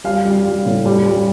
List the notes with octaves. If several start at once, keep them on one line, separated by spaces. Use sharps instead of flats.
G3 F5
G3
G3
A2
G3
G3